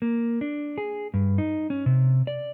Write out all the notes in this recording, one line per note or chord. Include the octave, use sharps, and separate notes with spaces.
A#3
D4
G#4
G2
D#4
C#4
C3
D5